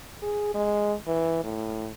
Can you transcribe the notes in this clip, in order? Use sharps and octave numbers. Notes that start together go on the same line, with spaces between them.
G#4
G#3
E3
A2